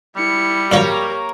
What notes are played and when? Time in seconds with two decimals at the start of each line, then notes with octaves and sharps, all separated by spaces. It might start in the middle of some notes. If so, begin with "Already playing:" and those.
0.16 G3 E4 C#7
0.72 G2 F3 F#3 A#3 G4 A#4 C#5